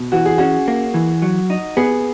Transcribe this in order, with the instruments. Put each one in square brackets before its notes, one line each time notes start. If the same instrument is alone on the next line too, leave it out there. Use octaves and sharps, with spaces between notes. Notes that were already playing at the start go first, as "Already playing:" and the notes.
Already playing: [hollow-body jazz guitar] B2
[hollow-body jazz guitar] E3 [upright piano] F#4
[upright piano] G#4
[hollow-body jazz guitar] C#4 [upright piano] F#4
[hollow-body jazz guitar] A#3
E3
F#3
D#4
[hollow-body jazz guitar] B3 [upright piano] G#4